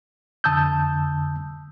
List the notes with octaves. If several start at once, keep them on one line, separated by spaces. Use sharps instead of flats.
F2 D3 A5 D#6 E6 G6